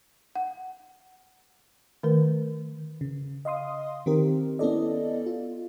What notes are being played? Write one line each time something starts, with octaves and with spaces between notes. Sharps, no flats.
F#5
D#3 A3 A#4
C#3
D#5 F5 C6 D#6
D#3 C4 G4 A#4
B3 C#4 E4 A4 D5 D#5
F4